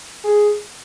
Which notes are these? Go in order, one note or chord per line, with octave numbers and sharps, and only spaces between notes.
G#4